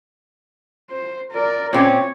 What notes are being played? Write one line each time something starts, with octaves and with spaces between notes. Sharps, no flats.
C5
A#4 D5
A#2 C4 C#4 C#5